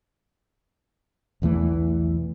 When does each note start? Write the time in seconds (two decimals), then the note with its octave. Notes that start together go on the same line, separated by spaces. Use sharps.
1.42 B1 E2 E3 A3